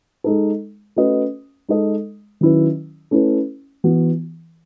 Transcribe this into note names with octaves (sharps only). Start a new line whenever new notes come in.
G#3 D#4 A4
A3 C#4 F#4 B4 D#5
G#3 D#4 A4 D#5
D#3 F#3 C#4 E4 B4
A3 C#4 E4 B4
E3 B3 F#4